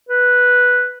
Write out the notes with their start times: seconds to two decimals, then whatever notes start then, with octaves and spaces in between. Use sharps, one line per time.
0.09 B4